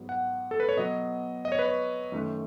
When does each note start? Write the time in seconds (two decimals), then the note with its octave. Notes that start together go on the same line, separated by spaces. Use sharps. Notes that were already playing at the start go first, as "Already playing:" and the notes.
Already playing: G#2 F#3 B3
0.09 F#5
0.51 A4
0.60 B4
0.69 C#5
0.77 B2 F#3 B3 D#5
1.45 D#5
1.52 C#5
1.59 B4
1.66 C#5
2.12 F#2 D#3 A3